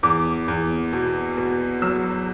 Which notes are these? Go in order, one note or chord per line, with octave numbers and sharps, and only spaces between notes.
E2 D6
E2
B2
B2
F#3 E6